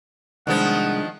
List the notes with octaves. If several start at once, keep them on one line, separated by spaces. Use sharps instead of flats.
C2 D#3 F3 G#3 B3 D4 F#5